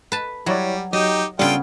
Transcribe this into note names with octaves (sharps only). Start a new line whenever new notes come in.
B4 A5
F#3 G3 E4 C#5 D5
F#3 D#4 G4 D#5
C#3 G3 B3 D4 F4 A4 G5